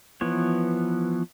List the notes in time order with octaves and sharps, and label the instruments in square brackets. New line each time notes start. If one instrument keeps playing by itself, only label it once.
[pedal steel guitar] E3 F3 B3 C#5